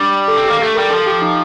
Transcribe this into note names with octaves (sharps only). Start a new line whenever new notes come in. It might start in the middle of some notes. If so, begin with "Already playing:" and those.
Already playing: G3 D4
A4
C4
G4
A#3
A3 A4
G3 A#4
F3 A4
G4
D#4